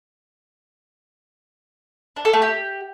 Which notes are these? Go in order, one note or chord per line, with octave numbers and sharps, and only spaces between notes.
D4
A4
A3
G4